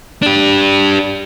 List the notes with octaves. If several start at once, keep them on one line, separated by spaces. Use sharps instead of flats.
D4 G4